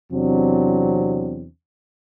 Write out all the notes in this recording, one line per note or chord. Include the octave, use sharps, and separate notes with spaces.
E2 C3 F#3 C4 D4